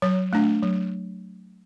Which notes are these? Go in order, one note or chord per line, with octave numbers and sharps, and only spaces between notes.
F#3 C#5
A3 D4
F#3